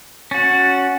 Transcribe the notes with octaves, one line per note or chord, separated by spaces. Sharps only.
C#4 F#4 A6